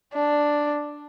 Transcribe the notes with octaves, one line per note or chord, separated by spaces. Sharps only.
D4